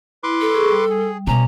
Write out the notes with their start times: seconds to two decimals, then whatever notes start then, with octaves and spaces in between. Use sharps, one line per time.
0.23 E4 B4 C6 D6
0.41 A4
0.54 G#4 C#6
0.72 G3
0.90 G#4
1.27 B2 C#4 A#5